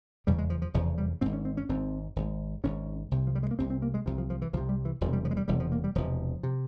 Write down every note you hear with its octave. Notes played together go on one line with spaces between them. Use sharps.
F1 E2 C#3 G3
G#3
F3
F3
F1 E2 C#3 F3
G3
G#1 G#2 C4
C#4
C4
C#4
G#1 G#2 C4
G#1 G#2
G#1 G#2 C#4
C2 C3
F3
G3
G#3
A#3
C2 C3 C4
C4
A#3
G#3
C2 C3 F3
F3
F3
E3
C2 C3 F3
G3
E3
E1 E2 C3 F3
G3
F3
G#3
G3
E1 E2 C3 G3
F3
A#3
G3
E1 E2 C3 F3
C3